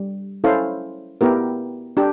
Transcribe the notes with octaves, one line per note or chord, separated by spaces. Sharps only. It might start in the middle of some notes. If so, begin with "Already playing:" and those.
Already playing: G3
C#4 E4 A4 C5 F5
B3 E4 G4 A#4
D4 G4